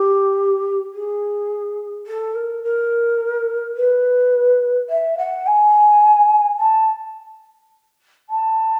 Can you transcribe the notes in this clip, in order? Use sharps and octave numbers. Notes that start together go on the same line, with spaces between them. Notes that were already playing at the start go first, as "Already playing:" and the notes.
Already playing: G4
G#4
A4
A#4
A#4
B4
E5
F#5
G#5
A5
A5